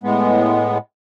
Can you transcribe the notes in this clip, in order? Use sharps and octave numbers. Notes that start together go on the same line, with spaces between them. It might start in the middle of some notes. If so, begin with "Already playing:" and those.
A2 G#3 B3